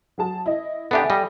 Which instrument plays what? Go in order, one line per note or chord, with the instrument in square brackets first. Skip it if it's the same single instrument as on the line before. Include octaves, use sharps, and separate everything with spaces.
[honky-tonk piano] F#3 G#4 A5
E4 D#5
[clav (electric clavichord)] B3 D4 G4 [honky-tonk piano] A4 E5 G#5
[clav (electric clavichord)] G3 D#5